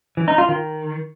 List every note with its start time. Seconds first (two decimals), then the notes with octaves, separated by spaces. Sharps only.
0.17 E3
0.28 D#4
0.38 F4
0.49 D#3